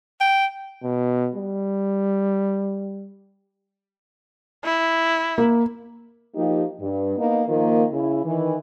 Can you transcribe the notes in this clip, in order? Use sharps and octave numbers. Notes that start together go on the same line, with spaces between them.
G5
B2
G3
E4
A#3
F3 A#3 D#4 G4
G2
A#3 B3 D#4
D#3 F3 A#3
C#3 E4
D#3 E3